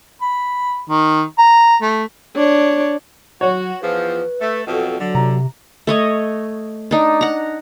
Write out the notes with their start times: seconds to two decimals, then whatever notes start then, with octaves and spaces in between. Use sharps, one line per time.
0.22 B5
0.89 D#3
1.38 A#5
1.82 A3
2.36 D4 C#5
3.41 F#3 F#4 C#5
3.81 E2 F3 B4
4.41 A3
4.67 F2 B2 F#3 A4
4.99 D3 F#3
5.15 C3 A#5
5.87 A3 C#5 D#5
6.91 D4 D#4
7.21 F#5 A#5